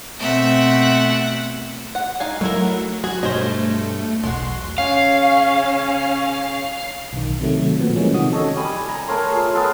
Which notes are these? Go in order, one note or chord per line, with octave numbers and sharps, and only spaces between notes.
B2 A3 C4 E5 F#5
F#5
D#4 F5 G#5
F#3 A3 D#4 E4 A#4
F#3 F#4 G#4
G2 B2 A3 C5 C#5 D#5
E1 B1 G#3 F#4 C6
C#3 C#4 F5
B1 D#3
C3 D#3 F#3 A3
A#2 F3 B3
E3 F3 G3 G#3 A#3 C#4
C3 D#3 F3 F#4 D#6
C#4 A4 C#5 D#5
G3 G#5 B5 D#6
A#5
A3 A#4 C#5 C6
F4 G#4
G#3 B3 A4 A#4